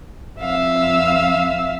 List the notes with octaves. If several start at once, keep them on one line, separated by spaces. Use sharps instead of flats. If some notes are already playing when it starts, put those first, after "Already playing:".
F2 E5 F5 E6